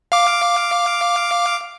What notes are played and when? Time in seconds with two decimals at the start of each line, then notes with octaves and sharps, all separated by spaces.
0.12 F5 D6